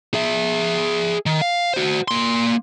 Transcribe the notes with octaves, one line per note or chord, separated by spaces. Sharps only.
G#4 E5
D#3
F5
F#4 C5
A#3 C6